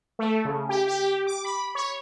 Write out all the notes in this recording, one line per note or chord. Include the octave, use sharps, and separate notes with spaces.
A3
C#3
G4
G4
D6
B5
C#5